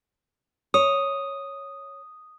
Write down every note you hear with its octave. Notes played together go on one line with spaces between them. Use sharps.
C#5 D#6